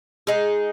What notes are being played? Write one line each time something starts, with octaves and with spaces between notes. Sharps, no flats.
G#3 D#4 G#4